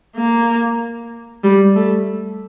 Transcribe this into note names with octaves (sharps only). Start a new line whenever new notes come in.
A#3
G3
A3